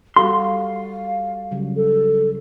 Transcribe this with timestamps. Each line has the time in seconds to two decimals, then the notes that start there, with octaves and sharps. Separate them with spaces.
0.16 G3 F#4 A4 F5 C6
1.51 C#3 F#3 G3
1.76 A4